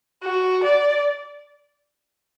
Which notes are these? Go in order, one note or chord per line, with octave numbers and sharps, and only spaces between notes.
F#4
D5